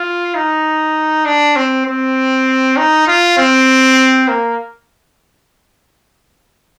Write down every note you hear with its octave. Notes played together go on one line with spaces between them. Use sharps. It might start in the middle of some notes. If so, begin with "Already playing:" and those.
Already playing: F4
D#4
D4
C4
C4
D#4
F4
C4
A#3